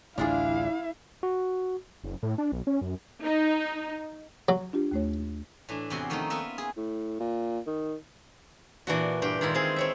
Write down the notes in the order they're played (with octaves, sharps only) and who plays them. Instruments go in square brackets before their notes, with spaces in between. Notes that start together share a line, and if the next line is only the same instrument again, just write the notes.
[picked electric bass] A1 D2 [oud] D4 F4 G#4 [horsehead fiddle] E4 [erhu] F5
[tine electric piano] F#4
[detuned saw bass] F#1
A2
D4
B1
C#4
F#2
[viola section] D#4
[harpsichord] F#3
[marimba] D4 F4 G4
D#2 A3 C#5
[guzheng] A2 E3 D4
E2 C3 F#4 G#4 C6
D#3 F3 A3 C4 C#4 D#4
A#3 B3 F4 B4 E5
G#4
[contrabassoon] A2
A#2
D#3
[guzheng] A#2 E3 D4 F#4
G2 G4 G5
D#3 G#3 E4 F4
C4 G#4
C4 C#5 E5